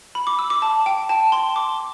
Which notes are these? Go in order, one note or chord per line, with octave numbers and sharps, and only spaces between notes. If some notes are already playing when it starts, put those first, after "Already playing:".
B5
D6
E6
D6
A5
G5
A5
C6
D6